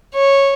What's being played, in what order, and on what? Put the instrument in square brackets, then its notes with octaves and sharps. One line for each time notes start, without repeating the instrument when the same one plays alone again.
[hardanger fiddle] C#5